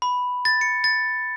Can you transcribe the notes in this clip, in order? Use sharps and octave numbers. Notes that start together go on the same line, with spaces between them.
B5
A6
C#7
A6